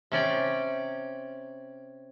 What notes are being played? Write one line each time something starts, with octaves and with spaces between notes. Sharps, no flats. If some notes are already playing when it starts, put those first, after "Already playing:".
C3 C#4 D5 G5